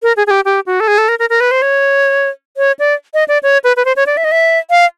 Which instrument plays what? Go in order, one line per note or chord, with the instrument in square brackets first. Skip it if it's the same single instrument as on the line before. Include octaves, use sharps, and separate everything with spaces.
[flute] A#4
G#4
G#4
G4
G4
F#4
A4
G#4
A4
A#4
A#4
A#4
B4
C5
C#5
C#5
D5
D#5
D5
C#5
B4
B4
C5
C#5
D5
E5
D#5
E5
F5